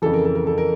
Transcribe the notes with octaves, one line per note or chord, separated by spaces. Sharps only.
F2 C#3 E3 A4
A#4
A4
A#4
A4
A#4